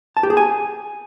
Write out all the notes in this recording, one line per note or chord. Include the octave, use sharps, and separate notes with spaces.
A5
G4
G#4
G#5